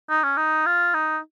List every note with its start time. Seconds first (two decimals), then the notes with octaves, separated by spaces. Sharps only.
0.09 D#4
0.23 C#4
0.37 D#4
0.66 F4
0.94 D#4